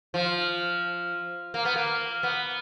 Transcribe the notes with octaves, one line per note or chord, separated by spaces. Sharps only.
F3
A#3
B3
A#3
B3